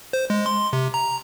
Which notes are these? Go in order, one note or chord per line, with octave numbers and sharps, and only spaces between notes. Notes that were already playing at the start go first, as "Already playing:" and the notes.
C5
G#3
C6
C3
A#5